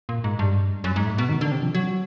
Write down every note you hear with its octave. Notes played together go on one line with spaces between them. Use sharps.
A#2
G#2
G2
F#2
G#2
A2
B2
D#3
D3
C3
F3
F#3